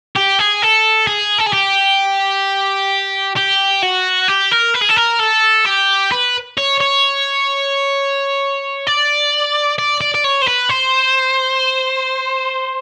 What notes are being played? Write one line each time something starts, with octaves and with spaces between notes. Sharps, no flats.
G4
G#4
A4
G#4
A4
G#4
G4
G4
F#4
G4
A#4
B4
G#4
A4
A#4
A4
G4
B4
C#5
C#5
D5
D5
D5
D5
C#5
C5
B4
C5